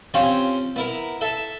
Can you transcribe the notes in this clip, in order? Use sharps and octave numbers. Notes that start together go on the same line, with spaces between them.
C4 C#4 F4 G4 C#5
B3 E4 A#4
A4 E5